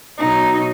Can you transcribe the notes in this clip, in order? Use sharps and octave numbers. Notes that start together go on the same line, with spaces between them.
B2 F#3 D#4